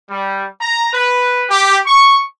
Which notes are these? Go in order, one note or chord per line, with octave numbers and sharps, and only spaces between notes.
G3
A#5
B4
G4
C#6